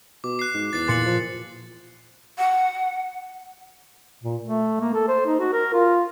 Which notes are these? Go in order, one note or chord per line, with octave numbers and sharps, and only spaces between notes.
B2 D6
F#6 C7
G#2
E2 A6 C7
A#2 C6 A6 C#7 F#7
F3
F#5
A#2
A3
A#3
A4
C5
D#4
F#4
A#4
F4